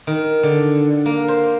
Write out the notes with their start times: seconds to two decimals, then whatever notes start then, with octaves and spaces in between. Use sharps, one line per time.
0.07 D#3
0.43 D3
1.06 A#3
1.28 C5